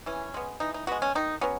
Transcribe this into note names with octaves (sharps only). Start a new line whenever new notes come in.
E3 C#4
G#3 B3
E3 D#4
D#4
G#3 B3 F#4
C#4
D#3 D#4
F#3 B3 C#4